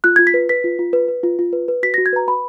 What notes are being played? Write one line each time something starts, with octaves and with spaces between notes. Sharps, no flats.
F4 F#6
F4 G#6
B6
B4
B4 B6
F4
F4
B4
B4
F4
F4
B4
B4
F#4 B6
F#4 A#6
G#6
B4 A#5
B4 B5